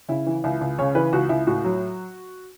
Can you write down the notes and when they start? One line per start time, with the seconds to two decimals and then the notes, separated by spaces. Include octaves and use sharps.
0.09 C#3 E4
0.26 E3
0.44 C#2 E4
0.61 C#2
0.79 C#3 C#5
0.95 E3 B4
1.13 C#2 F#4
1.29 C#2 E4
1.47 A2 F#4
1.64 F#3